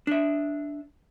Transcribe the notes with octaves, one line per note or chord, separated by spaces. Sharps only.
D4 E5